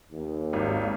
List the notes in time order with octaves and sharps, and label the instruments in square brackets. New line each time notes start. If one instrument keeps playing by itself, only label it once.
[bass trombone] D#2
[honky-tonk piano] G#1